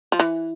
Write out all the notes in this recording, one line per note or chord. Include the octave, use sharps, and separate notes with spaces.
F3
E3